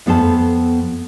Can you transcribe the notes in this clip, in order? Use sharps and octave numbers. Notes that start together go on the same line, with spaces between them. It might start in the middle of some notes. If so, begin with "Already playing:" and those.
F2 B3 A4 C5 A5